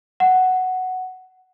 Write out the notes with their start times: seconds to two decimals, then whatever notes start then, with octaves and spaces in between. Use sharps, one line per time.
0.20 F#5